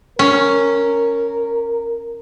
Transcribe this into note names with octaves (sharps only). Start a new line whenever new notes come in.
C#4 A#4